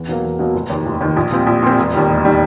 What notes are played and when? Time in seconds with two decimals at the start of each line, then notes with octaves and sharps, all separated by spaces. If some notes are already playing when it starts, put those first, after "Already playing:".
Already playing: E2
0.08 B2 F#3 A#3
0.23 E2
0.39 B2 F#3 A#3
0.54 F1
0.70 D#2 D#3
0.86 F1
1.01 D#2 D#3
1.16 A#1
1.32 A#2 G3 C4
1.47 A#1
1.63 A#2 G3 C4
1.78 E1
1.94 D#2 D#3 G3
2.09 E1
2.24 D#3 G3